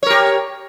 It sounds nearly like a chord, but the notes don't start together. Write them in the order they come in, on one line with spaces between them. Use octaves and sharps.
C#5 A#4 G4